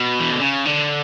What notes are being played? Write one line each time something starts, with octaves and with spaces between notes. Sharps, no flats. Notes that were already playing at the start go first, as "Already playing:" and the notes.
Already playing: B2
E3
D3
C#3
D3